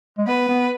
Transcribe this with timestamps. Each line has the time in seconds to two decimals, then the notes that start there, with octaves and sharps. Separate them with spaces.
0.18 G#3
0.27 B3 B4
0.49 B3